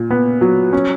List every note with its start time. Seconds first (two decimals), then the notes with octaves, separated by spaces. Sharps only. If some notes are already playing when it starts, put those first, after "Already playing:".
Already playing: A#2
0.11 B3
0.41 F#3
0.73 C#4